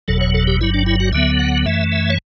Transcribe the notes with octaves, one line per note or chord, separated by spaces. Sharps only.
F#1 E2 B2 F#3 A4
C#5
A4
G4
G1 G2 F#3 E4
D4
E4
F#4
D2 D3 F#3 B3 E5
F#5
F#2 E3 A3 E5
E5
C#5